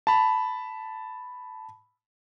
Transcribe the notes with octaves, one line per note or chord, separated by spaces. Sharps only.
A5 B5